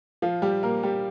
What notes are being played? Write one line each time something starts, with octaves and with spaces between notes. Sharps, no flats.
F3 F4
G3 G4
A#3 A#4
G3 G4